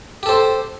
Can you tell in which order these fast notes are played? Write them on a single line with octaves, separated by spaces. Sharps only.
G4 A4 C5